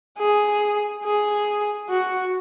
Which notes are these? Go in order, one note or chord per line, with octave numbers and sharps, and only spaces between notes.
G#4
G#4
F#4